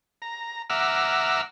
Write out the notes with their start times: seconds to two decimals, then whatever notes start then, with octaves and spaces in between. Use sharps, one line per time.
0.22 A#5
0.70 E5 F#5 A#5 D6 E6 F6